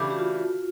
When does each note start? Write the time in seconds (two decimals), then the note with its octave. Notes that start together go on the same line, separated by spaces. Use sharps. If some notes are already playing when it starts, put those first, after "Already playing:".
Already playing: C#3 E3 A3 D4 G4
0.10 F#4
0.19 F4